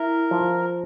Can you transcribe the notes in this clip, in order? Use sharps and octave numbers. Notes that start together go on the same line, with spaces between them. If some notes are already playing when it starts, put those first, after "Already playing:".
Already playing: E4 A#4
F3